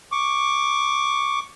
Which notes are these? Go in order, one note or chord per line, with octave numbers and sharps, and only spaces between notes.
C#6 D6